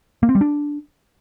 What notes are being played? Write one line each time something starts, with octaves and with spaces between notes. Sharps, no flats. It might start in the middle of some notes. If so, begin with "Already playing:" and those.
A#3
C4
G3
D4